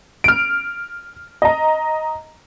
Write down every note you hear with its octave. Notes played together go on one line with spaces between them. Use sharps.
F6 D7
D#5 A#5